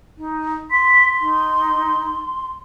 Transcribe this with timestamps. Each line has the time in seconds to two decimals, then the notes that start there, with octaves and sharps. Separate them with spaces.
0.17 D#4
0.71 C6 B6
1.20 D#4